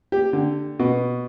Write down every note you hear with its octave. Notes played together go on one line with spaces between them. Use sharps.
G4
D3
B2